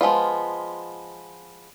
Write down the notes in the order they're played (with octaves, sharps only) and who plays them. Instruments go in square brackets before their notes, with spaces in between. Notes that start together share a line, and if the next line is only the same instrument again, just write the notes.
[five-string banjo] F3 G#3 B3 F4